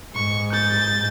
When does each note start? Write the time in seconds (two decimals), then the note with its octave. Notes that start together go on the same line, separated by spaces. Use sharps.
0.15 G#2 C#6
0.52 G6 A6